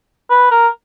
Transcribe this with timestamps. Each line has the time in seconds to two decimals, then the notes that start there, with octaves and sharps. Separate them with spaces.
0.30 B4
0.51 A#4